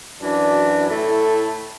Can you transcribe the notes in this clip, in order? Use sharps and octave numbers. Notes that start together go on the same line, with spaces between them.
F#2 E3 D4 F#4
A2 A3 E4 A4